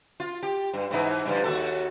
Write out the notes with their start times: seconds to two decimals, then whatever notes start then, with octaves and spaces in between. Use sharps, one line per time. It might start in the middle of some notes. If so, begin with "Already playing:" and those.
0.20 F4
0.43 G4
0.73 G2
0.91 G#2 E3 D#4
1.25 G2 D3 F3
1.44 D#2 F#4 A4